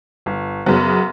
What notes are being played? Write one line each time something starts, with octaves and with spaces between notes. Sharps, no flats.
G1
F#2 C#3 F#3 B3